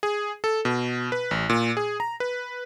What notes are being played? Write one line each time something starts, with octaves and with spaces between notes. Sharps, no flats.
G#4
A4
B2
B4
A1
A#2
G#4
A#5
B4